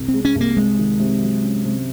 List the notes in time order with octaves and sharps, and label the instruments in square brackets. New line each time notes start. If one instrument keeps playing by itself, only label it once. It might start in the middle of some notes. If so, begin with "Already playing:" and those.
Already playing: [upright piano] C2
[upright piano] G#3 [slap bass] C4
[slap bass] C#4
[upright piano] C2
[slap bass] A#3
[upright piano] C3 [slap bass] G#3
[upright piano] D#3
C3
F#3
C#4
C3